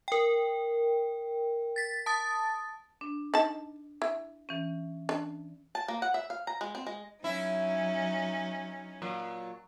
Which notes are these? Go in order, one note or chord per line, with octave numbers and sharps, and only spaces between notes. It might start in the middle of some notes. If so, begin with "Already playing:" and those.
A#4 G5
A6 B6
A5 D#6 A6
D4
D#4 A5
E4
E3 C#4
D4
A5
A#3
F#5
E5
F5
A#5
G#3
C4
G#3
F#3 C#4 D#4 E4
A#2 F#3